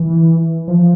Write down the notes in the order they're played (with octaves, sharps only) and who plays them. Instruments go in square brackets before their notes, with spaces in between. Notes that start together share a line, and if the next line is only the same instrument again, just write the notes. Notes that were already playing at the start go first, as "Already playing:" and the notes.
Already playing: [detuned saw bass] E3
F3